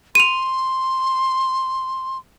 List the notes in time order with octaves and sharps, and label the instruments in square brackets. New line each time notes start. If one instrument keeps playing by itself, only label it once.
[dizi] C6 [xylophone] D#7 F7